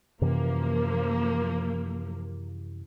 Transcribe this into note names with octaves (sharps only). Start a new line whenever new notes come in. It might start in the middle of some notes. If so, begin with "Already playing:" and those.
F#2 C3 E3 F3 A#3